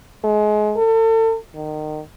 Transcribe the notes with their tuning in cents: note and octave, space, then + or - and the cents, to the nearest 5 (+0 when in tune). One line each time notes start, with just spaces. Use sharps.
G#3 +30
A4 +35
D#3 -25